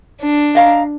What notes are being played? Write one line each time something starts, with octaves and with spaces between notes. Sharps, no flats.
D4
D#5 F5 A#5